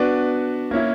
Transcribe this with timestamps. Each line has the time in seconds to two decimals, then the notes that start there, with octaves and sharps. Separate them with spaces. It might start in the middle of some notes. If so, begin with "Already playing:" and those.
Already playing: B3 D4 F#4 B4 D5
0.71 A#3 C#4 E4